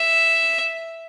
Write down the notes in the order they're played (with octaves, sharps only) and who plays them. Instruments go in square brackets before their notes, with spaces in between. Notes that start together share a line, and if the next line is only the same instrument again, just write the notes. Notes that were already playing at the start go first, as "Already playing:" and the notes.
Already playing: [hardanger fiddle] E5